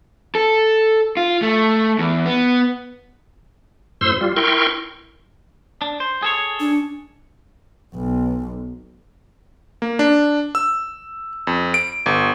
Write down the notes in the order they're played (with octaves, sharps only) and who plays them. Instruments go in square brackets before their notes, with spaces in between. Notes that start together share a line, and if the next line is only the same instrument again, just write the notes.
[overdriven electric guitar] A4
F4
A3
E2
B3
[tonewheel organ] F#2 A2 C5 C6 E6
G3 F4
E4 A#4 G5 C6 C#6
[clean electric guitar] D4
C5
G#4 A4 C#5
[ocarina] D4
[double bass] B1
[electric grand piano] A#3
D4
E6
F2
D7
G1